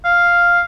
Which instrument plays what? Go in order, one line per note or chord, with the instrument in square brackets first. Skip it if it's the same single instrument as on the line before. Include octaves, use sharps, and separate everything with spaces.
[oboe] F5